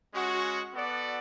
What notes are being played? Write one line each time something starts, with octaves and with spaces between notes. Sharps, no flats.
G#3 C#4 F#4
B3 F#4 A4 D5 F#5